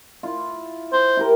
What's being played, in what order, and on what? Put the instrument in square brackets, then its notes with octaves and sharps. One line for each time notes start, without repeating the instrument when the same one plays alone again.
[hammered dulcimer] E4 F4
[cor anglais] C5
[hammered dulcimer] E4 G4 A#4